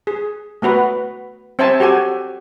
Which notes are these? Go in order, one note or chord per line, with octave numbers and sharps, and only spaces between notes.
G#4
A3 B3 F#4 B4
C4 C5 E5 G#5 A5
F#4 G4 A4 G#5